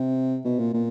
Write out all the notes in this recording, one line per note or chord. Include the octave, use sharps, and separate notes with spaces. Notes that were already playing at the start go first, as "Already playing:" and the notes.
Already playing: C3
B2
A#2
A#2